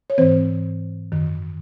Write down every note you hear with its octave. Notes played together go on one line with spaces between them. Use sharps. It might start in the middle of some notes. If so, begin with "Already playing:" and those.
C#5
G#2 E3 C4 C5
F#2 D#3